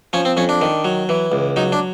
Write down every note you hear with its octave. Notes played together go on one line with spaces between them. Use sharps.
F3 C#4
C4
F2 C#4
D4
D#3
F#3
E3
C#2
F#3 D#4
D4